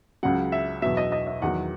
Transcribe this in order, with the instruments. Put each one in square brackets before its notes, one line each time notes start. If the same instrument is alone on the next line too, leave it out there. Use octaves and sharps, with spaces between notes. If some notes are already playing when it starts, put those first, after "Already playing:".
[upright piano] C#2 C#3 F#3 F#5
E5
E2 B2 F#3 E5
D#5
D#5
E5
E2 D#3 F#3 F#5